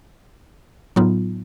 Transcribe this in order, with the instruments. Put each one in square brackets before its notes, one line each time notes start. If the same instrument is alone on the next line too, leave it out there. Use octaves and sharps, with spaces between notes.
[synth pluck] A2 F#3 B3 D#4 F4